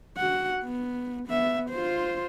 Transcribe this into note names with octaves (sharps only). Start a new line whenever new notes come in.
F#4 F#5
B3
B3 E5
F4 C5